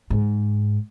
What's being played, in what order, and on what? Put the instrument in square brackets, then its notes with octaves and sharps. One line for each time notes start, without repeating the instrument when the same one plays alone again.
[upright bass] G#2